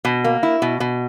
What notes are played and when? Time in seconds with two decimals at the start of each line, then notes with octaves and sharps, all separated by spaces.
0.05 B2
0.24 A#3
0.43 E4
0.62 B2
0.80 B2